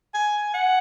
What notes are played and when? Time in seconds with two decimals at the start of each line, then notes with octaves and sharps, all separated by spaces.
0.14 G#5
0.54 F#5